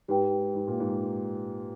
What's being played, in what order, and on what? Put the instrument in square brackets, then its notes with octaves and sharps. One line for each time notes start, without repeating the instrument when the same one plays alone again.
[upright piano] G#2 [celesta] G4 B4 G5
[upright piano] G#2
A#2
G#2